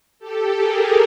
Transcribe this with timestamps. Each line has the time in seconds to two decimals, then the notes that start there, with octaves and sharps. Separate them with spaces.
0.19 G4 A4
0.56 G#4 A#4